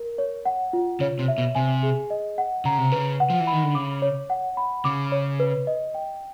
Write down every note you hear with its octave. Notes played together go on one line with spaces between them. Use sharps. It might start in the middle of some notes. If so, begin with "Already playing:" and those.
Already playing: A#4
C#5
F#5
F4
C#3 C#5
C3
E5
B2
C3 G#5
G#4
D#5
F#5
C#3 A#5
C3
C#3 B4
F#5
F3
E3
B5
D#3
D3
C#3 D6
C#5
F#5
B5
C#3 D6
C#5
B4
D#5
G5